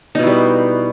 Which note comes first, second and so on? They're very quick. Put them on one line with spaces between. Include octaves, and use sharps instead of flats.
D#4 B2 E4 G3